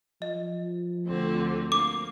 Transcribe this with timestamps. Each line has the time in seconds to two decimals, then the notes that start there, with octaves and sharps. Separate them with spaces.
0.22 F3 D#5
1.06 D2 D3 C4
1.72 A#3 D6